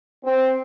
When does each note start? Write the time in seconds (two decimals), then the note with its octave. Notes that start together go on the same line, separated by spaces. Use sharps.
0.25 C4